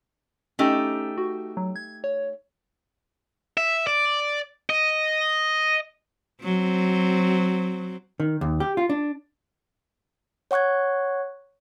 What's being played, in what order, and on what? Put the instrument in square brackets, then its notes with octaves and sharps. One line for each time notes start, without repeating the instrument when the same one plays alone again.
[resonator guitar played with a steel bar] A3 D#4 G4 [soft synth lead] C#4
[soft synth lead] F#4
F#3
G#6
C#5
[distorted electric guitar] E5
D5
D#5
[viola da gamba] F#3 C4
[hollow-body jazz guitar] D#3
D#2
G4
F4
D4
[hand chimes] C#5 F#5 C#6 F#6 G#6